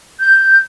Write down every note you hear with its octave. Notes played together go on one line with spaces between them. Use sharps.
G6